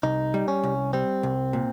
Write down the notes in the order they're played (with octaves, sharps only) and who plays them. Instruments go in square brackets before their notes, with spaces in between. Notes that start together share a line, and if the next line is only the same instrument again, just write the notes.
[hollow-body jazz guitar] C2 [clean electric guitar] D#4
[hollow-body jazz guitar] G3
[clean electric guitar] C#4
[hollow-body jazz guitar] C2
[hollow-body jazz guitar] G3 [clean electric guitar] C4
[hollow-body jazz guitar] C2
A#2